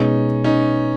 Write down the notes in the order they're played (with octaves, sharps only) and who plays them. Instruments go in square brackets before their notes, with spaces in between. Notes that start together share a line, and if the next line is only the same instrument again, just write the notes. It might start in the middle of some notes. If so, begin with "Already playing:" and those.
Already playing: [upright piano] B2 G#3 B3 [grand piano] C#4 D#4
[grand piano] C#4 D#4